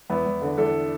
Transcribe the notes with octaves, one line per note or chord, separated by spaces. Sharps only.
E2 B3 E4
E2
D3
E2 E4 A4